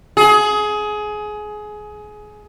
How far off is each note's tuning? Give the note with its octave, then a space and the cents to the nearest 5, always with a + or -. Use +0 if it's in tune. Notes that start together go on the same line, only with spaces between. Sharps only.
G#4 +20